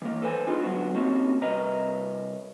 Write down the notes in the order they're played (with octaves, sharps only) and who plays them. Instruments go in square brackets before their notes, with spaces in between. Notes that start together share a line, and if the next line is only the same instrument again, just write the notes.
[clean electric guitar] E3 A#3
A4 B4 C5 G#5
B3 D4 D#4 F4 G#4
D3 F#3 G#3 A3 B3 F#4
A#3 C4 C#4 D#4 F#4 G4
C2 A#4 B4 D#5 E5 A#5